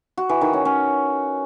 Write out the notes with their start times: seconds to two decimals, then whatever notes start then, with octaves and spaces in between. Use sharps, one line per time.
0.17 F#4
0.29 E3
0.41 D#3
0.53 C#4
0.65 C#4